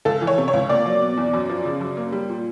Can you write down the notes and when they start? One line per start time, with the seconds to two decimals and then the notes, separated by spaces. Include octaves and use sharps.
0.05 C#2 A4
0.21 E3
0.27 C#5
0.38 C3
0.48 C#5
0.53 C#2
0.69 A#3 D5
0.85 F#3
1.01 B2
1.17 E2
1.33 F#2
1.49 F3
1.65 C#3
1.81 F#2
1.97 A#3
2.12 G3
2.29 A#2